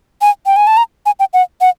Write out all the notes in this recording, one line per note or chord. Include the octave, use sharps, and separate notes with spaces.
G#5
G5
G#5
A5
A#5
G#5
G5
F#5
F#5